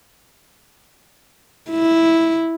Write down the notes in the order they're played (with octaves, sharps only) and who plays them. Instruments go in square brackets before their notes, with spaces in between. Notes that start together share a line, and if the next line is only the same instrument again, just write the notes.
[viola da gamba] E4